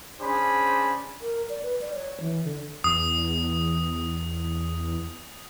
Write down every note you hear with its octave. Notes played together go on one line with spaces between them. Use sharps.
C#4 D4 G#4 C5 B5
A#4
D5
B4
D5
C#5
E3
D3
E2 D#6